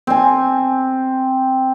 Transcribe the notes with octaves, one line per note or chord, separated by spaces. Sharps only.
C4 G#5